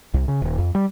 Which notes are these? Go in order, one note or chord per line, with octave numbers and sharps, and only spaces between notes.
C2
C#3
D#1
F2
G3